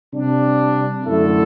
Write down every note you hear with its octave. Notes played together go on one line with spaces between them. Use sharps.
C3 G3 D4
F#2 D3 A3 E4 A4